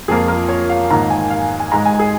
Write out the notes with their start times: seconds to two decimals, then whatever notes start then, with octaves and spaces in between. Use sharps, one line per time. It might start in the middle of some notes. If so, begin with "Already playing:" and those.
0.08 F2 F3 A#3 G#4
0.28 A#4
0.49 C#5
0.69 F5
0.90 G#2 D#3 A#3 A#5
1.10 G#5
1.30 F5
1.60 G#5
1.72 G#2 G#3 A#5
1.85 G#5
1.99 G#4